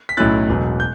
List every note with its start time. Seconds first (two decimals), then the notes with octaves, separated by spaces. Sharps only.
0.09 B6
0.17 B1 A2 F#3 C#4 E4 F#6 A6
0.49 E1 E2 B2 F#3
0.80 G6